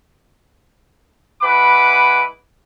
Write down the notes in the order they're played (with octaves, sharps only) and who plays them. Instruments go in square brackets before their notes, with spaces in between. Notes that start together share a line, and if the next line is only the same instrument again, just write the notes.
[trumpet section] G#3 E4 B4 F#5 B5 D6